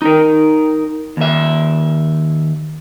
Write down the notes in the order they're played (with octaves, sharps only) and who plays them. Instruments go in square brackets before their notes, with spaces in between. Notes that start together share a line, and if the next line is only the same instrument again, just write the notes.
[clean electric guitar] D#4 A#4
D#2 E5